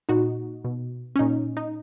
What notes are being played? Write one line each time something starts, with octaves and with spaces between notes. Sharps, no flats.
A#2 D#4 F#4
B2
C#4
A#2 D#4
D#4